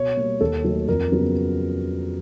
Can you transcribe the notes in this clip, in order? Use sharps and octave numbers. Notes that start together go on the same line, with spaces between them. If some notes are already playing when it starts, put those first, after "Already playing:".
Already playing: B2 C#5
G3 A#3
D#2 A4
D#3 F#3 A3
F2 A#4
C#3 F#3 B3